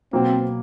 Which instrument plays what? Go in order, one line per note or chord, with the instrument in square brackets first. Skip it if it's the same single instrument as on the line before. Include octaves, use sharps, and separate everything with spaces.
[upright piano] B2 F#3 A#3 [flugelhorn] C4